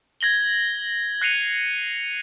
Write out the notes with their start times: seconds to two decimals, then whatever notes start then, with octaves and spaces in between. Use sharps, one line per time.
0.21 G#6 A#6 F#7 G7
1.21 F#6 A#6 C7 C#7 D#7 F7